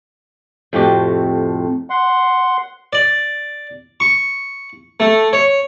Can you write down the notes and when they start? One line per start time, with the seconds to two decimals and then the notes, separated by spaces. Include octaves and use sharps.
0.73 F2 A2 C3 F#4 G4
1.90 F#5 C6
2.93 D5
4.00 C#6
5.00 A3
5.33 C#5